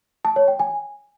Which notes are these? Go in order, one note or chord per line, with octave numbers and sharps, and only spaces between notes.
A5
C#5
G5
G#5